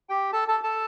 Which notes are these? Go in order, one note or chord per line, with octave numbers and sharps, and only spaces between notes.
G4 G5
A4 A5
A4 A5
A4 A5